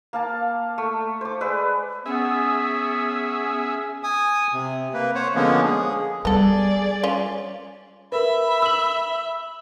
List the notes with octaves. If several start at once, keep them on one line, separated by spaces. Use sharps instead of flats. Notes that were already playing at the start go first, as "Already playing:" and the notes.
A#3 F5 A5
A3
C5 D6
G#3 B4 D5 E6
B3 C#4 G#4 E5
G#5 D#6
C3
A#3 B4
C5 C#5 F#5
D3 F3 G#3 A#3 B3 C#4
G#4
G3 B3 G#4 A4 D5
C#4 F4
A#4 B4 E5 B5
E6 F#7